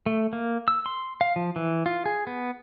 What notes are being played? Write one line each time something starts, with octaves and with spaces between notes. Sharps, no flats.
A3
A#3
E6
C6
F5
F3
E3
F4
G#4
B3